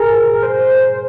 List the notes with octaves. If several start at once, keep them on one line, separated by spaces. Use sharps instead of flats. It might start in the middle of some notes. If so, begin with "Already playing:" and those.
Already playing: G#4 A#4
C5